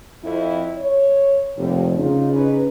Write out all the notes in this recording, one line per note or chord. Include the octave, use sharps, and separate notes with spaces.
F2 E4
C#5
F1 D#2
C#3 D#4 F4
C#4 D#4 B4